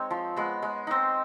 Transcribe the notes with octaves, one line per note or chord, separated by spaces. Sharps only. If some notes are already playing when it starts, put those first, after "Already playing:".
Already playing: G#3 C4 D#4 C#5
F3
G#3 B3
G#3
C4 D#4